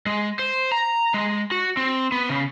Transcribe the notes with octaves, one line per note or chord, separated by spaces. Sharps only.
G#3
C5
A#5
G#3
F#4
C4
B3
C#3